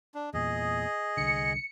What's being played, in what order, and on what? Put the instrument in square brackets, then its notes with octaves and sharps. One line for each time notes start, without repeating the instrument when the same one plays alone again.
[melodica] D4
[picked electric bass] E2 A#2 [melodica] G#4 D#5
[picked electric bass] C2 D3 [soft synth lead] C#7